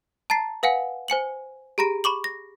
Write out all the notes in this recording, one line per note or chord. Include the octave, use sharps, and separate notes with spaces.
A5 A#5 A6 C7
B4 F5 F#5 G#5
C5 G#5 C#7 F#7
G4 G#4 A#5 B5 A#6 D7
B5 C#6 D6 F#7
A#6